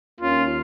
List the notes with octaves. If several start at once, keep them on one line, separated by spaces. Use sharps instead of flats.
D#2 D#3 A#3 C#4 F4